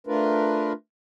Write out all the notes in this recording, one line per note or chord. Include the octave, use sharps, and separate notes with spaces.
A3 D4 F4 A#4 B4